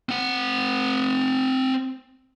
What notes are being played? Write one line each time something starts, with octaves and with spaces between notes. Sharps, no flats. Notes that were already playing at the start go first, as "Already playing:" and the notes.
C4 F#5